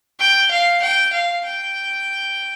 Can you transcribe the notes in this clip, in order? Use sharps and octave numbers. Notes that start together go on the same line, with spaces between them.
G5
F5
G5
F5
G5